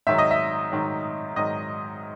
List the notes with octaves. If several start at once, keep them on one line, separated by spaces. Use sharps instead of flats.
G#2 D#3 F#3 E5
D#5
E5
G#2 D#3 F#3
G#2 D#3 F#3 D#5